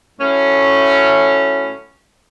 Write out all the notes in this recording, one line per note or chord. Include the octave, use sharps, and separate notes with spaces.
A2 F#3 A3 C#4